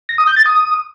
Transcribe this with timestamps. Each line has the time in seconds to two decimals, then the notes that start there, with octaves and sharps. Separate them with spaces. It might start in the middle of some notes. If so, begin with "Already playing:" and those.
0.09 A#6
0.18 D#6
0.27 G6
0.36 A6
0.46 D#6